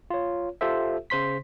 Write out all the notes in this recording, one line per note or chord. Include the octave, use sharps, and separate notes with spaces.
F4 C#5
F4 G4 A4 C5 E5
C#3 C5 C6 B6